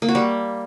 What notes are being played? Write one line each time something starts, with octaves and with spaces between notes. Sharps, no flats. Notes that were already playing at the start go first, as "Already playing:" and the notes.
A#3
F#4
G3